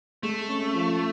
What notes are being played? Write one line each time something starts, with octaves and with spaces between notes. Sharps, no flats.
G#3 A3
C#4
F3